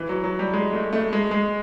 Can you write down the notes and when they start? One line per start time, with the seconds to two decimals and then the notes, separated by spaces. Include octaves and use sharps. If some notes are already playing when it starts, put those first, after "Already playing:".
Already playing: E3
0.09 F#3
0.24 F#3
0.39 G3
0.53 G#3
0.73 A3
0.93 A3
1.13 G#3
1.31 G#3